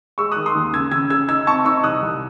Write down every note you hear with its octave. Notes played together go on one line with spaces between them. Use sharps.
G#3 C#6 E6
D#6 F#6
D#3
C6 D#6
D#2
C#3 E6 G#6
C#3 E6 G#6
C#3 E6 G#6
D#4 E6 G#6
C4 A5 C#6
D#4 C#6 E6
C2 D#6 F#6
C2